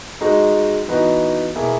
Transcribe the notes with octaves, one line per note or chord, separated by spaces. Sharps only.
G#3 D#4 F#4
E3 B3 D#4 F#4
B2 A#3 E4 G#4